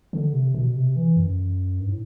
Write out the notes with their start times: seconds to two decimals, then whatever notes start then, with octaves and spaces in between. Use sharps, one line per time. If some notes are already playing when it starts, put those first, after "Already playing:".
0.13 D3
0.33 C3
0.54 B2
0.76 C3
0.96 E3
1.16 F#2
1.80 G2
1.89 A2